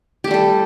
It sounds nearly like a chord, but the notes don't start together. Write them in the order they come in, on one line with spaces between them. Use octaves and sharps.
G4 A3 G3 A4